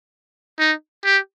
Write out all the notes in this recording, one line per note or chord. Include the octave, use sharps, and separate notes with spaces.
D#4
G4